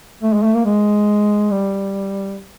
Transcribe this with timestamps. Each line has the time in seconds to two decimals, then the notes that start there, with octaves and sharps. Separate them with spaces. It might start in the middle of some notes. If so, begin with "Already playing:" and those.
0.23 A3
0.33 G#3
0.43 A3
0.55 A#3
0.65 G#3
1.51 G3